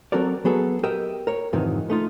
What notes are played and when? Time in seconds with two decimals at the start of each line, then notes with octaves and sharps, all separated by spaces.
0.12 F#3 C4 F#4 A4 A#4 D5
0.45 F#3 B3 G#4 A4
0.83 G4 A#4 D#5 E5 G5
1.27 A#4 C#5
1.53 F2 G#2 C3 D#3 E3
1.90 A3 D#4 F4